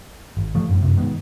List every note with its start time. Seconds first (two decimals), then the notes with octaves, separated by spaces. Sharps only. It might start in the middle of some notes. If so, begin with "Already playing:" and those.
0.37 G#1
0.55 D2 F3 A3
0.69 F#2 A2
0.83 F#2 C3
0.97 G#2 D#3 B3